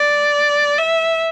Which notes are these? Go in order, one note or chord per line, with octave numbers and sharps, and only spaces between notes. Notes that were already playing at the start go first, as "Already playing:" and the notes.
Already playing: D5
E5